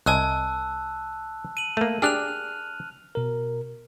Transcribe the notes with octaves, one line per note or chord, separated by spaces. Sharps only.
C2 D#5 G#5 A5 E6 F#6
D#7 F#7
A3 A#3
D4 G4 G#4 F6 F#6 F7
B2 A#4